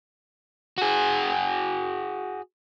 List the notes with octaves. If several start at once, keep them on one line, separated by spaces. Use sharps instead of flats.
F#4 G#4